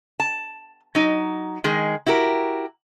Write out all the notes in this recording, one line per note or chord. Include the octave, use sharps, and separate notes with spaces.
A5
F#3 D#4
D#3 G#3 G#4
E4 F#4 G4 A#4